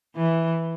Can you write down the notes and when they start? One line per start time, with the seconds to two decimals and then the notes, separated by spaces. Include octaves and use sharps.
0.16 E3